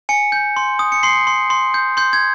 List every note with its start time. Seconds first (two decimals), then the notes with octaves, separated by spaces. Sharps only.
0.09 G#5 C#7
0.32 G6
0.56 C6
0.79 D#6
0.92 C#7
1.03 C6 C7
1.27 C6
1.50 C6
1.74 G6
1.97 C6 G6
2.13 G#6